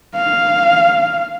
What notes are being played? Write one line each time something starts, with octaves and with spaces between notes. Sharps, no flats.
F5